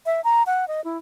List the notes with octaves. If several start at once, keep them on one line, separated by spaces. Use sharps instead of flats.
E5
A#5
F#5
D#5
E4